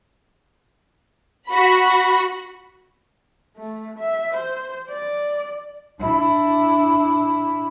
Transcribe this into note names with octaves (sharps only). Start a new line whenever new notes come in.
F#4 B5
A3
E5
C5
D5
D4 E4